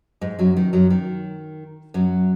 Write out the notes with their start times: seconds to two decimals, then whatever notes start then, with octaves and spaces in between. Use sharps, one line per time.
0.21 G#2 G#3
0.39 F#2 F#3
0.57 D#3
0.73 F#2 F#3
0.90 D#3
1.94 F#2 F#3